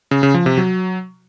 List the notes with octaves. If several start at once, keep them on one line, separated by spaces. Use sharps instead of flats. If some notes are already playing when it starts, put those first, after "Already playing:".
C#3
C#3
F3
C3
F#3